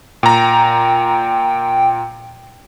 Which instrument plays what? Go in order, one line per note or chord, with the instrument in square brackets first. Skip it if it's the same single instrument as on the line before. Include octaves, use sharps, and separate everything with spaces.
[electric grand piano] A#2 A#5 [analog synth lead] G5